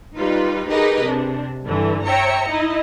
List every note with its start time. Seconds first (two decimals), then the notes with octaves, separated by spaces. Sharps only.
0.17 G3 D#4 F4 B4
0.70 D#4 G4 G#4 A#4 B4 D#5
1.03 C3 D4
1.64 G2 D3 E3
2.04 C#5 E5 G5 A#5 C#7
2.48 D#4 E4 D#5